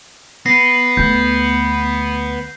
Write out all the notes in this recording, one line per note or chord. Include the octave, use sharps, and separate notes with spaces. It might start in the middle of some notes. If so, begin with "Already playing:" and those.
B3 A#6 C7
D2 A3 G6